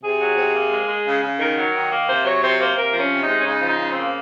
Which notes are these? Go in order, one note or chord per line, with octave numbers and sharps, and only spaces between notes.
C3 G#4
F#3
C3
A#3
G#3
G#3
C#3
C#3
D#3 A#4
F#3
D#3
A#3
C3 C5
F#3 C#5
C3 C5
A#3 C5
C3 A#4
F3
C#4
C3
D#4
G#3
C#4
C#3 D#4
F3
D#4
C#3
C4
A#3